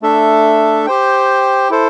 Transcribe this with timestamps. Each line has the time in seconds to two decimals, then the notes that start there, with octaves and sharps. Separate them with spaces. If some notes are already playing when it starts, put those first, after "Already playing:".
0.02 A3 D4 A4 E5
0.86 G4 C5 G5
1.70 E4 A4 C5